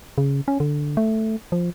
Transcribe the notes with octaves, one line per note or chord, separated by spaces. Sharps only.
C#3
C#4
D3
A3
F3